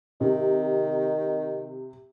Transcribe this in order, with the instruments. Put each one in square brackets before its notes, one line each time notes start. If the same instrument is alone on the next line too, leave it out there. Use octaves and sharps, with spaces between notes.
[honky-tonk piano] C3 [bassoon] D#3